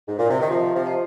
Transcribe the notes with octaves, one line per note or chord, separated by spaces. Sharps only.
G#2
A#2
C3
D#3
C3 F3 F4
C3 F3
C5 D#5